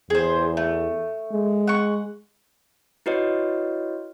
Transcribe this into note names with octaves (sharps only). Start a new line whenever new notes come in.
E2 G#4 C5
A3
G#3
F#5 C#6
E4 F#4 B4 C#5 D#5